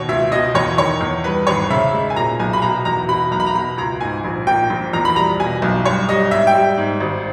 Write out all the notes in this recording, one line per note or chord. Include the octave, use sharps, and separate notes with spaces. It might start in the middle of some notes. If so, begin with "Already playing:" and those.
Already playing: D#2 B2 C#5
C#2 E5
B2 D#5
E2 C#5
D#3 C#5
E2
G2 B4
G#1 C#5
C#3 E5
G#3
G#5
A#2 A#5
B1 G#5
B5
B2 A#5
E2 A#5
B2 B5
B1 A#5
B5
A#5
B2 B5
C#2 A#5
G#2 G#5
A#1
A#2 G5
A#1
E2 A#5
B5
G3 A#5
B2 G#5
B1
G2 C#5
G3 D#5
G#2 E5
G5
G3
G#2
G#1